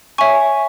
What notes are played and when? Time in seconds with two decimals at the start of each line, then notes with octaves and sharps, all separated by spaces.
0.18 C#5 E5 G#5 C#6